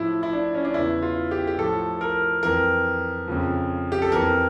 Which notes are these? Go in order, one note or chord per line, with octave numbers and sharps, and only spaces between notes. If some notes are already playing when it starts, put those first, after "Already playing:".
Already playing: A2 F3 E4
E4
D4
C#4
D4
E2 C#3 E3 E4
F4
G4
G4
A2 F3 A4
A#4
F2 E3 A#4
F2 C#3 F3
G4
A4
F2 E3 A#4